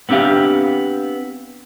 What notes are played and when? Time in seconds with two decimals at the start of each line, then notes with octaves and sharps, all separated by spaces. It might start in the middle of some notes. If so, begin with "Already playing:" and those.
0.09 B3 C4 D4 G4 F5